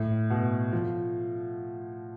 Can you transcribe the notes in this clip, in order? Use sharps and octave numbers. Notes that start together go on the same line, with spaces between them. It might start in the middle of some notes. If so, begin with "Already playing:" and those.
Already playing: A2
B2
F3